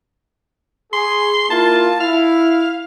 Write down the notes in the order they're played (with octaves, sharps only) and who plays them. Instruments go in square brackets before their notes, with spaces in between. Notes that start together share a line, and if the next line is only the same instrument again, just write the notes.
[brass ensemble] G#4 [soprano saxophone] C6
[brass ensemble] A#3 E4 F4 [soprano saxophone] A5
[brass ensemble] E4 [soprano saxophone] F5